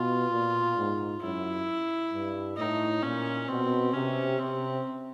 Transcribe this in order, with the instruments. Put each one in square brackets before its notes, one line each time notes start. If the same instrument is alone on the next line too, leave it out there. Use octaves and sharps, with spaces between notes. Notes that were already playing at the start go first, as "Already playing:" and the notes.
Already playing: [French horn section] B2 [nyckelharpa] F4
[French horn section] A#2
G#2
[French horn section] F#2 [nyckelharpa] E4
[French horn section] G2
[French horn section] A2 [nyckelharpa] D#4
[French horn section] A#2 [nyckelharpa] C#4
[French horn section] B2 [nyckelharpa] C4
[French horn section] C3 [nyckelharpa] C#4
[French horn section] C3 [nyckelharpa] C4